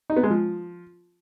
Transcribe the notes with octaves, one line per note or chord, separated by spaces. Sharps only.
D#4
B3
G#3
F3